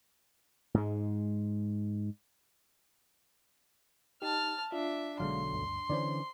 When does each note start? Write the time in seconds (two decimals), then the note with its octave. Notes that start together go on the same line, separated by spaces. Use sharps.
0.74 G#2 G#3
4.22 D#4 G4 A5 F6
4.72 D4 F4 E5
5.20 B1 D3 F#3 G#3 F5 C6
5.53 D2 G2
5.89 D3 E3 C#4 C5 D5